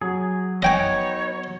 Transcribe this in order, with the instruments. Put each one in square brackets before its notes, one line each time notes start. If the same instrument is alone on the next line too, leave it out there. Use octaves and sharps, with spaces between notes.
[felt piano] F#3 [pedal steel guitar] G#4
[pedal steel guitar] B3 D#4 [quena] C#5 [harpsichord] D#5 G5 G#5